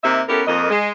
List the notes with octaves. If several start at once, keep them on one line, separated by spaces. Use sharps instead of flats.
C3 A#3 D#4 E5
B3 C#4 E4 G4 A4 A#4
F2 A#3 D#5
G#3